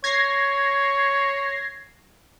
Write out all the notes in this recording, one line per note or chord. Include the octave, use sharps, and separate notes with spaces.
C#5 G#6 A#6 C7